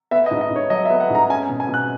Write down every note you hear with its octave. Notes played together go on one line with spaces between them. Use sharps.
B3 E5
D#5
G#2
D#5
G#2
C#5
F#3 D#5
E5
B3
F#5
G#2 A#5
C#4 G#5
B2
G#5
B2
F#6